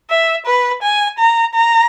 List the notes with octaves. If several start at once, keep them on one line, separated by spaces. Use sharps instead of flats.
E5
B4
G#5
A#5
A#5